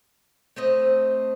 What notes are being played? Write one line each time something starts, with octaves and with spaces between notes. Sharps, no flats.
A3 C4 C5 D#5